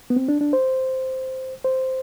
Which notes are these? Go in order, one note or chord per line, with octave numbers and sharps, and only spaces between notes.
B3
C4
D4
D4
C5
C5